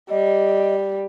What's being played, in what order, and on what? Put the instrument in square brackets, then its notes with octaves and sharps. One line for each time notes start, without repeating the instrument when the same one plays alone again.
[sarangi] G3 [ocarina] D#5